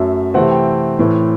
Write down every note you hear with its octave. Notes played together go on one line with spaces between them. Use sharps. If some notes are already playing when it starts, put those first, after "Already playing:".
Already playing: F#2 F#3 A3 E5
C3 E3 A3 C4 F#5
G5
A2 E3 A3 C4